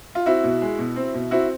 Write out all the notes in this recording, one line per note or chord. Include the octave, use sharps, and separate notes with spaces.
F4
C4 E4 F#4
B2
G#3
B2
C4
B2
C4 E4 F#4